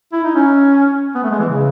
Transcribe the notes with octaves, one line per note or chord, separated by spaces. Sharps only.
E4
D#4
C#4
B3
A3
G#3
E3
C#3